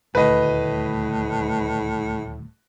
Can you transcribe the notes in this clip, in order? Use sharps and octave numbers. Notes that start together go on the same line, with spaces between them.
D#1 D2 A2 B4 D#5